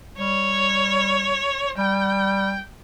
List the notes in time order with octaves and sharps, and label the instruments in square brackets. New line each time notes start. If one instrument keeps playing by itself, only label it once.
[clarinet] G3 [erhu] C#5
[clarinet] G3 [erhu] G5